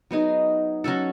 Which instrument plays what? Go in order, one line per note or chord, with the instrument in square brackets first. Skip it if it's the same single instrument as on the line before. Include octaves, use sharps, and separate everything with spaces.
[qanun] F#3 B3 D#4 G#4
F#3 C#4 F#4 A4